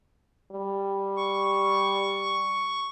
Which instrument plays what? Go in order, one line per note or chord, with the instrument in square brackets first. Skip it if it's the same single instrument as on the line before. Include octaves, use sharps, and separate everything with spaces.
[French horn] G3
[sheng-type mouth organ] C#6